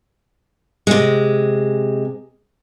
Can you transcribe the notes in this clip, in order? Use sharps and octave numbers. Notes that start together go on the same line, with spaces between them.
C3 G#3